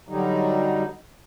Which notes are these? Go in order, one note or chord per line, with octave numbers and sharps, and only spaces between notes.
D3 F#3 G3 D#4